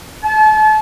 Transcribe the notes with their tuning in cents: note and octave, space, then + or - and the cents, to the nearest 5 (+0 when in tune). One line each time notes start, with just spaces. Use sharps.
A5 -35